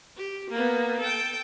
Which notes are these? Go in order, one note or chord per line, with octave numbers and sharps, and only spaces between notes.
G4
A#3 B3
A4 G5